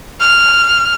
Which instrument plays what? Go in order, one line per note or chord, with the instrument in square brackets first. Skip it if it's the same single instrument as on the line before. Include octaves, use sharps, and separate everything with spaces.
[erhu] F6